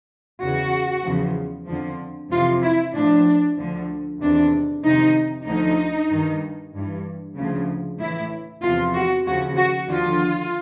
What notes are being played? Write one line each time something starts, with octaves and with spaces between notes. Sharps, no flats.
E2 C#3 E3 F#4
E2 C#3 F3
F2 D3 F3
F2 C3 E3 F4
E4
A2 F3 D4
D2 D3 F3
E2 C3 D#3 D4
F2 C3 D#3 D#4
D2 D3 F3 D#4
G2 D#3
G2 E3
D2 C#3 F3
A2 E3 E4
E2 C3 F3 F4
F#4
D#2 C#3 F3 F#4
F#4
D#2 D3 F3 F4